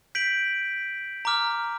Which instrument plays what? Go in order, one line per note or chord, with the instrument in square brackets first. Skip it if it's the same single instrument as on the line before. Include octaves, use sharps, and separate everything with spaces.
[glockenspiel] G6 B6 D7 F#7
A#5 D6 F6